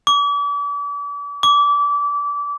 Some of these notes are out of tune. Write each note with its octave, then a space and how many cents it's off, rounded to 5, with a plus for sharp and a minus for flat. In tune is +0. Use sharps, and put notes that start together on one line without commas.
D6 -40
D6 -25